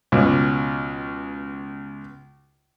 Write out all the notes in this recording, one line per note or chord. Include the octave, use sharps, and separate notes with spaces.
C#2 B2